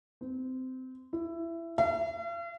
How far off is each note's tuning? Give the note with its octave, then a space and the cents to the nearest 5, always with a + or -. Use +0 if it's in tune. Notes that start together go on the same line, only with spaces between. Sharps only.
C4 -20
E4 +20
F5 -45